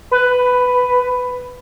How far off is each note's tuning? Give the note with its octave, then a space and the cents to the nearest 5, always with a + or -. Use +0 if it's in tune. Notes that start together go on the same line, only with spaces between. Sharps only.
B4 +10